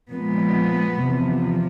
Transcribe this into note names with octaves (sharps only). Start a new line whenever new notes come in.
A#2 F3 G#3 B3
E2 C3 F3